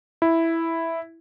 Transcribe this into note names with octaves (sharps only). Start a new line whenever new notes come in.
E4